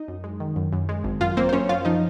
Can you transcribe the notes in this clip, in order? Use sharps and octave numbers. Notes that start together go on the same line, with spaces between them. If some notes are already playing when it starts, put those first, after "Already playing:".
Already playing: D#4 D#5
F#2
G#3
D#3
F#2
F#2
G#3
G#1
F#2 F4 F5
A#3 C4 C5
C5
F#2 C#4 C#5
F#2 F4 F5
F3 D#4 D#5